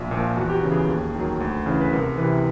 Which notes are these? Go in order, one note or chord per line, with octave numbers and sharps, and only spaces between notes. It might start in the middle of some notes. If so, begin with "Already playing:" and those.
Already playing: A#1 F4
A#2 F3
E2 F#4
G4
F#4
C#3 E3
G#4
D#2
D#3 F#3
D2
C#3 E3
B4
C2 A#4
C3 E3 B4